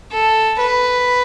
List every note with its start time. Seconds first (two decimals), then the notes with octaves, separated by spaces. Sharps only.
0.12 A4
0.60 B4